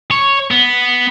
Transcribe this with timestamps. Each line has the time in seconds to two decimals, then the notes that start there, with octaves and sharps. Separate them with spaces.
0.11 C#5
0.51 B3